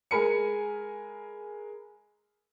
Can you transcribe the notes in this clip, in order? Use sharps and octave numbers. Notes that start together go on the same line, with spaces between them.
G#3 A#4 G#5 B5 C#7